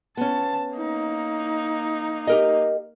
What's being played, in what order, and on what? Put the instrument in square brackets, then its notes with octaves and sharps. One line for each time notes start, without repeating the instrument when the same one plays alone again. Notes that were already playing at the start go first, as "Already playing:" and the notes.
[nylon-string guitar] B3 C#4 [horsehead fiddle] A5
[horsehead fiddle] A#3 D#4
[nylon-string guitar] G4 A#4 D#5